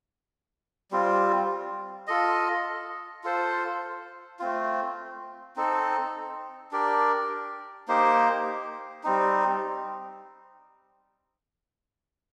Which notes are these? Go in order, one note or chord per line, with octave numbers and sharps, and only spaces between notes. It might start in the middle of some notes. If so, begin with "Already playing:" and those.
G3 C4 F4
F4 A4 D#5
F4 A4 C5
A3 C4 F4
C4 D#4 A4
D4 G4 A#4 D5
A#3 D#4 G4 C5
G3 C4 D#4